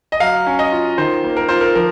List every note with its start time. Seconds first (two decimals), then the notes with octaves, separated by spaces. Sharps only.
0.12 D#5
0.20 F#3 F5
0.46 C#4
0.59 D#5
0.72 F4
0.98 D#3 C5
1.24 A#3
1.37 A#4
1.49 F4 C5
1.61 A#4
1.75 F3 A#4